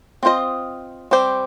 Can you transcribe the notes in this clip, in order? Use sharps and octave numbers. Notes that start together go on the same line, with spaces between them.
C4 F4 C5 D#5
G3 C4 G4 C5